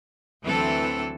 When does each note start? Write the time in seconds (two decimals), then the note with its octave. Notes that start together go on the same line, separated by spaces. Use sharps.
0.42 D2 E3 F#3 C4 A4